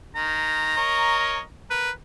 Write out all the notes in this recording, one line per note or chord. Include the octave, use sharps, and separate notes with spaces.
D#3 A#5
A#4 C#5 D#5
A#4 B4